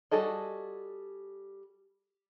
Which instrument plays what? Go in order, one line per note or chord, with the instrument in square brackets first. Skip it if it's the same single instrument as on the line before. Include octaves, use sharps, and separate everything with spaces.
[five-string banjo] G3 F#4 G#4 A4 D#5